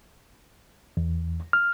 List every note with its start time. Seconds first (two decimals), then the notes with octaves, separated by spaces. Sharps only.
0.97 E2
1.53 F6